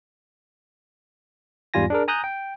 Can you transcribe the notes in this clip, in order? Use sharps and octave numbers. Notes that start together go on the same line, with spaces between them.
E2 G#2 G3 F4 G#5 A#6
D4 G#4 A#4
G#5 A#5 D#6 F#6 G6 A#6
G5